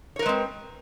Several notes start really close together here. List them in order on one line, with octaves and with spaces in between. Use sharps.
C#5 A#4 B4 G#3 C4